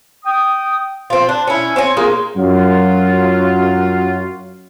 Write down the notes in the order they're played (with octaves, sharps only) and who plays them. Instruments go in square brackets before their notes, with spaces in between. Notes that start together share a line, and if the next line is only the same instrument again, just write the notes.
[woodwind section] G5 D#6
[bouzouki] C4 F4
D4
C#4 E4
C4 C#5 G#5
G#3 A#3 D#4 F4
[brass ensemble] F#2 F#3 F4